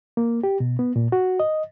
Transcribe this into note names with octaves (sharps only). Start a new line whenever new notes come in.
A#3
G4
B2
B3
A#2
F#4
D#5